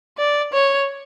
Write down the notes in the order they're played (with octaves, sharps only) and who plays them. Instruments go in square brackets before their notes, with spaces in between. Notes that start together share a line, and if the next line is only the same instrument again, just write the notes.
[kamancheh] D5
C#5